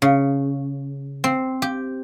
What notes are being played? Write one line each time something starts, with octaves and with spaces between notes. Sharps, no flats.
C#3
C4
G4